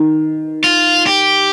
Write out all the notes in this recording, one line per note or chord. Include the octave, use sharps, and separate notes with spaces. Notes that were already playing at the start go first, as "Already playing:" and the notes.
Already playing: D#3
F4
G4